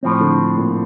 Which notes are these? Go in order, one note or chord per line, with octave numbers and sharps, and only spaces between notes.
A2 F3 C4
D3
A#2